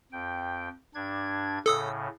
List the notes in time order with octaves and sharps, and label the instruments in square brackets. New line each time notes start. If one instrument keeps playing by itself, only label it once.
[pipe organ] F2 G5
G2 D4 G#6
[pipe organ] A2 C#3 [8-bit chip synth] A4 D#6 E6